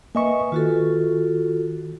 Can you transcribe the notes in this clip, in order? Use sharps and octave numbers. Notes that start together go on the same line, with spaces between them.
A#3 B4 D#5 E5 G#5 C#6
D#3 F4 F#4 A4